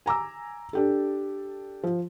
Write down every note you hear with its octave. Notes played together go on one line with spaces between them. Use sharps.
G#5 A#5 D6 E6
D4 G4 A4
F3